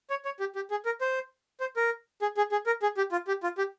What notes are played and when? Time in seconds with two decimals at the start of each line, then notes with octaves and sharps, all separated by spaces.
0.10 C#5
0.25 C#5
0.40 G4
0.55 G4
0.71 G#4
0.85 A#4
1.01 C5
1.60 C5
1.76 A#4
2.22 G#4
2.37 G#4
2.52 G#4
2.66 A#4
2.82 G#4
2.97 G4
3.12 F4
3.28 G4
3.43 F4
3.58 G4